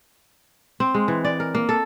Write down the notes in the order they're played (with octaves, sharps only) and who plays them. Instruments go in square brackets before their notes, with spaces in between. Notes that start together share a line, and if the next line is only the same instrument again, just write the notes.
[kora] C4
G#3
E3
D5
A#4
A#3
A4